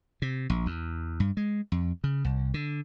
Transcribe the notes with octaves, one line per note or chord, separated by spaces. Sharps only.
C3
A#1
E2
G2
G#3
F2
C#3
C2
D3